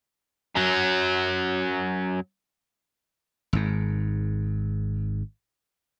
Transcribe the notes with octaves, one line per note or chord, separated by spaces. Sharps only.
F#2 F#3
G#1 G#2